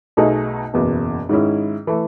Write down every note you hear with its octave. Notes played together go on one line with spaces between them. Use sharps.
B1 B2 A3 D#4 G#4
F#1 E2 B2
G#2 D#3 G#3 C#4 E4
E3 A3